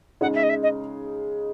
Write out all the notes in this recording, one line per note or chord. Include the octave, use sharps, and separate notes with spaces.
C#3 G#3 D#4 F#5
E5
D#5
E5
D#5